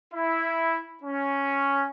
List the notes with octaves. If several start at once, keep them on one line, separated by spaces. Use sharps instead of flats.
E4
C#4